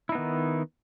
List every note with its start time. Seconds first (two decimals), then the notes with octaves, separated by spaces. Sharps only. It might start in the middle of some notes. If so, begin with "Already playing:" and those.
0.09 E4
0.12 D#4
0.15 B3
0.18 D#3